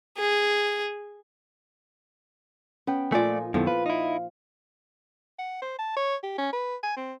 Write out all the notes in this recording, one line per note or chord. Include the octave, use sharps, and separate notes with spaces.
G#4
B3 C#4 G5
A#2 F3 A3 D#4 F4 A4 D5 G#5
F#2 D#3 F3 B3 E4 A4
B4 F5
D#4 E4
F#5
C5
A5
C#5
G4
C#4
B4
G#5
C4